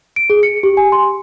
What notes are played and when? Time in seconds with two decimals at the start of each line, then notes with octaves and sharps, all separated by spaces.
0.16 D7
0.30 G#4
0.43 C#7
0.63 G4
0.77 G#5
0.92 C6